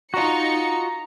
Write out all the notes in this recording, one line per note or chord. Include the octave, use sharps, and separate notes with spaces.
D#4 F4 F#4 A#5 C#7